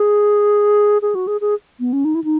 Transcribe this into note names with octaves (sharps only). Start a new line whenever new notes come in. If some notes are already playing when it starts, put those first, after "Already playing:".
Already playing: G#4
G#4
F#4
G#4
G#4
B3
C#4
D#4
E4
D#4